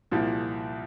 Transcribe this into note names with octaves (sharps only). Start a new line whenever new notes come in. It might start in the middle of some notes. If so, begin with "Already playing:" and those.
C2 A#2 F3